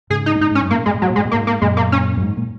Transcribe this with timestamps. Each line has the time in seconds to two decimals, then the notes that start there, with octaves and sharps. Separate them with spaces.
0.10 G#2 C#3 G#4
0.26 D#4
0.35 A#2
0.40 G#2 D#4
0.51 G#2
0.55 C#4
0.61 F#2
0.70 G#2 A#3
0.79 A#2
0.86 G#2 G#3
0.94 A#2
1.02 G#2 F#3
1.10 A#2
1.16 G#2 G#3
1.25 A#2
1.31 G#2 A#3
1.47 A#3
1.62 F#2 A#2 G#3
1.77 A#3
1.92 C#4
2.17 F#2
2.22 G#2
2.37 A#2